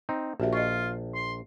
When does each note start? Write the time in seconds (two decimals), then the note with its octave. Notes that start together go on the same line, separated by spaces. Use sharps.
0.09 C4 D#4
0.40 A#1 F#4 G4 E5
0.53 F4 D#5 C#6
1.14 C6